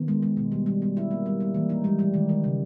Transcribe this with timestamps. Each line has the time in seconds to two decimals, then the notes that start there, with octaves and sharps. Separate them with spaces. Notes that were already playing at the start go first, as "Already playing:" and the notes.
Already playing: D#3 B3
0.08 G#3
0.22 G#3
0.37 B2
0.52 G3
0.66 G3
0.82 G3
0.96 B3 E4
1.11 A#3
1.26 G3
1.40 G3
1.54 E3 A#3
1.69 D#4
1.84 G3 G#3
1.99 G3
2.14 D#3
2.29 D#3
2.44 C#3